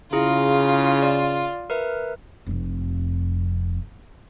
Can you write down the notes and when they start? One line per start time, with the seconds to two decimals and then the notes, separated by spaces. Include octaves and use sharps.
0.13 C#3 E4 F4 G#4 A#5
1.02 D5
1.70 A#4 B4 E5
2.46 F1 F2